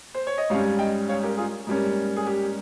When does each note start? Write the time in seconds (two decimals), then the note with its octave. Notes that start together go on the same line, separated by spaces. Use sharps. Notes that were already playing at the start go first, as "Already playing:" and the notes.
0.15 C5
0.27 C#5
0.38 D#5
0.50 G#2 G3 C#4 C#5 F5
0.79 D#5 G5
1.08 C#5 F5
1.23 G4 A#4
1.38 F4 G#4
1.67 G#2 G3 A#3 C#4
2.17 G#4
2.27 G4